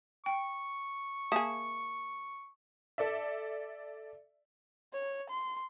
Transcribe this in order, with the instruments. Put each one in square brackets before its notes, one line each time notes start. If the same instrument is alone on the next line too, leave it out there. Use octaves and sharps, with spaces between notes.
[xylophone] G5 [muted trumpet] C#6
[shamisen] A#3 G#4 [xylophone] E5 A5 D#6
[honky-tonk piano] A4 D5 E5
[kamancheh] C#5
C6